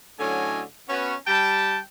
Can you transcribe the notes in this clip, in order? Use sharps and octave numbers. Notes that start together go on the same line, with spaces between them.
A2 D3 F#3 C#4 D#5 G#5
B3 C#4 F#4
G3 G5 A5